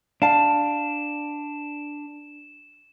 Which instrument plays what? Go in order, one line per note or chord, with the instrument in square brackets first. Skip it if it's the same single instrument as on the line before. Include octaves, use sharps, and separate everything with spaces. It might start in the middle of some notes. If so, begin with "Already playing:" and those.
[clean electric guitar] D4 [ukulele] F5 A5 [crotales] E7